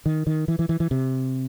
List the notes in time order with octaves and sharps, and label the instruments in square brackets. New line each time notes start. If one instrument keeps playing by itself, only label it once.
[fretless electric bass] D#3
D#3
E3
E3
E3
E3
C3